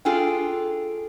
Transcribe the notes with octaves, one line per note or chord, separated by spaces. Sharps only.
D4 F4 G#4 A4 G5